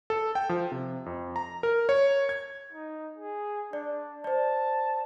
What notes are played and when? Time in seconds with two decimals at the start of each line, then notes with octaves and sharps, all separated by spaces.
0.10 A4
0.35 G5
0.49 F3
0.72 C3
1.06 F2
1.36 A#5
1.63 A#4
1.89 C#5
2.29 G#6
2.72 D#4
3.18 G#4
3.73 D4 D5
4.24 C5 D5 A5